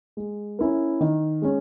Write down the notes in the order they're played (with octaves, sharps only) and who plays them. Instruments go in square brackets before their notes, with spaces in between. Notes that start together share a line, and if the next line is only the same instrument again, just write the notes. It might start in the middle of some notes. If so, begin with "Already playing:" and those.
[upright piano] G#3
C#4 E4 A#4
D#3
G#3 C#4